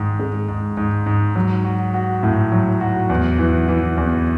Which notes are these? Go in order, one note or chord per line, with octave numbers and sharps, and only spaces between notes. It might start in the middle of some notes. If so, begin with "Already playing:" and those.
Already playing: G#2 D#3
G#3
G#2
G#2
G#2
F#3
F#4
F#4
A2
F#3
F#4
E2
E3
E3
E2